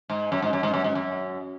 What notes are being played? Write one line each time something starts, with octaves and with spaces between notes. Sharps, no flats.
G#2
F#2
G#2
F#2
G#2
F#2
G#2
F#2